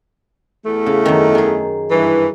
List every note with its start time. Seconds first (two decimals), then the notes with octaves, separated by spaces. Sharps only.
0.65 E2 A3
0.86 C#3
1.06 F#2 D#3
1.35 D#3 G#4
1.90 G2 E3